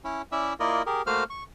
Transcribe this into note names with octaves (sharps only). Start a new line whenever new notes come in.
C#4 E4 C#5
C#4 E4 D5 E5
A#3 E4 F4 A#4 D5 D#5
G4 G#4 A#4
A3 A#3 F#4 C5 F5 F6
C#6